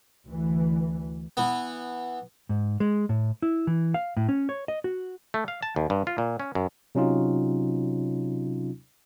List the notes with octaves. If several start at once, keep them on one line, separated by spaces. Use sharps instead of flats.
D2 E3
E3 B3
G#2
G#3
A2
E4
E3
F5
A2
C#4
C#5
D#5
F#4
A3
F5
A5
D#2
G2
F4
A#2
C#4
F#2
C3 F#3 C#4 D#4 F4